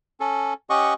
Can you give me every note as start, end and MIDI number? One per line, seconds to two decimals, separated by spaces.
0.20 0.54 61
0.20 0.54 69
0.70 0.94 61
0.70 0.94 67
0.70 0.94 75
0.70 0.94 78
0.70 0.94 85